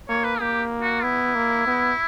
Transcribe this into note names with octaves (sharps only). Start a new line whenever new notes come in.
A#3 C#5
B4
A#3 G4
F#4
B3 E4
A#3
B3